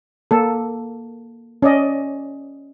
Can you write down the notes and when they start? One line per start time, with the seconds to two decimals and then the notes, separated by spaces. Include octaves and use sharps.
0.31 A#3 A4
1.62 C#4 D5 D#5